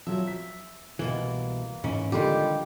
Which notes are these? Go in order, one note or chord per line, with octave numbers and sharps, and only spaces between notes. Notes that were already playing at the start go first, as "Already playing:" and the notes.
F3 F#3 E5
B6
C2 B2 E3 A#3
G#2 E3 A#3 C#4
D3 D#3 F3 G3 G#3 G4